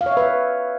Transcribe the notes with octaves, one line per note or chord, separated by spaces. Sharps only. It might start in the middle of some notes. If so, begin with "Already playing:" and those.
F5
C#5
E5
B4